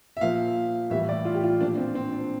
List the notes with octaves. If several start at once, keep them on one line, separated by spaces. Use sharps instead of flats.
E5
A#2 F3 F5
A2 E3 G3 E5
D5
F4
G4
F4
A#2 F3 D4
C4
C4
D4